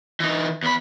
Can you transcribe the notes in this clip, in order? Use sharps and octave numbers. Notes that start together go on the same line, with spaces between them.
E3 D#4
E2 B5